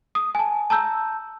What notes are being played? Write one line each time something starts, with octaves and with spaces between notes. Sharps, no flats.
D#6
G#5 A5
A5 A#5 E6 G6